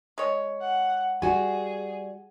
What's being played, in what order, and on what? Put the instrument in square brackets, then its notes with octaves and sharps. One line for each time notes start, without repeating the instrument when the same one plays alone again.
[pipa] G#3 C#5
[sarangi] F#5
[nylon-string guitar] G3 F#4 [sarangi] G#4 [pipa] G#5